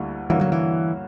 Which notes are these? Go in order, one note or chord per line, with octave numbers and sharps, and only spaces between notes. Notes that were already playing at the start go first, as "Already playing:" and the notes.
Already playing: D2 D3 G3 A#3 E4
G2 D3 E3 A#3 C#4 F#4
F#3
E3